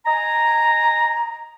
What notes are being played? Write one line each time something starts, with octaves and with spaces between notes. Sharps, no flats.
D#5 G#5 A#5